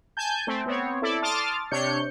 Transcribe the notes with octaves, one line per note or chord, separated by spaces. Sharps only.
G#5 A5 G6
A3 C4
B3 C4 C#5
E4 A4 D5
A5 C6 D6 D#6 F6 A6
C3 D4 C#5 G6 C#7